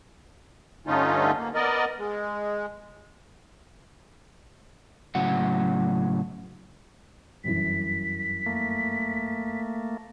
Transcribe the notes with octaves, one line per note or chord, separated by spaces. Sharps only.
G2 D3 A3 C#4 D#4 F4
A#3
B3 A#4 D5 D#5
G#3
A2 C#3 F#3 F#5
G1 F#2 E3 B6
A3 A#3